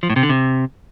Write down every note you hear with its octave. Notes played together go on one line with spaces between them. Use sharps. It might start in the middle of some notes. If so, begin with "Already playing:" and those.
F3
A2
C3
D3
C3